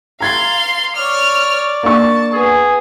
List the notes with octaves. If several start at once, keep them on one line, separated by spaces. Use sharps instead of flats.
F5 A#5 C6 G#6 A6
C#5 D5 F6
A#3 D4 A5 C#6
B3 G#4